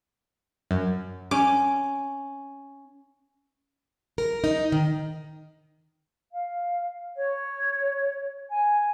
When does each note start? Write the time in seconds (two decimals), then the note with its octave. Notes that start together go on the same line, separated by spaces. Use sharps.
0.71 F#2
1.31 C#4 D6
4.18 A#4
4.44 D#4
4.72 D#3
6.31 F5
7.14 C#5
8.48 G#5